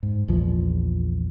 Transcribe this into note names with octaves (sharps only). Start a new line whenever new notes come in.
G#2
A#1 E2 F3